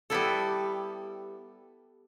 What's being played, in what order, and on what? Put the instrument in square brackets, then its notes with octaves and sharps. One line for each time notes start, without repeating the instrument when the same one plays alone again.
[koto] G3 B3 E4 A4